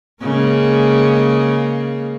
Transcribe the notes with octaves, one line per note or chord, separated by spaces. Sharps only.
C#3 G#3 A#3